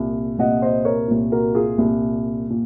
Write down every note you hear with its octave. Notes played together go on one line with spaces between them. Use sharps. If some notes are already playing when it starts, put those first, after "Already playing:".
Already playing: C2 A#2
C2 A#2 D#5 F#5
C5 D#5
A#4 C#5
C2 A#2
F#4 A#4
F4 G#4
C2 A#2
A#2